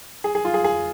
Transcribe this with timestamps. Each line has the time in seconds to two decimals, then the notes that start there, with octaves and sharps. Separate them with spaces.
0.24 G#4
0.35 G#4
0.45 F4
0.54 G#4
0.64 G#4